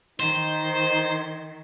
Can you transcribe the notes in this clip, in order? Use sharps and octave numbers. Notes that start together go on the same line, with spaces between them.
D#3 D#4 C5